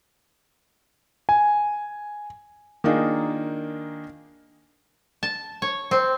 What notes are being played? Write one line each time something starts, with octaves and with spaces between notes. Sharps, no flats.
G#5
D#3 A#3 D4 D#4 F4 G#4
A5
C#5
C4